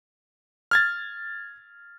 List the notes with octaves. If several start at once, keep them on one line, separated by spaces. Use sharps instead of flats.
F6 G#6 A6